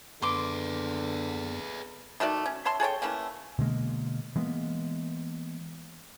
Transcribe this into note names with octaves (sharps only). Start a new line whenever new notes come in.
F#2 D3 B3 G#4 B4 C6 D6
D#3 A3 F#4 D5
C#4
C#5 E5 A5 C6
G#4 A4 C#5 G5
E3 A3 A#3 C#4
B2 D3 G#3 A#3
E3 G#3 A#3 B3